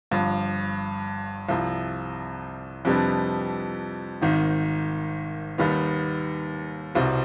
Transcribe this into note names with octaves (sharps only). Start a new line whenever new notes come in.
G1 G2 F3
C2 C3 F3
F2 C3 G3 B3 D4
G#1 G#2 D#3
D#2 D#3 G3 B3
C2 B2 G3 C4